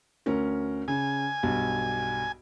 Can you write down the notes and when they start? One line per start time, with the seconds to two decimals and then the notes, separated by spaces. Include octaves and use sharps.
0.26 D2 C#4 A#4
0.88 C#3 G#5
1.43 B1 G2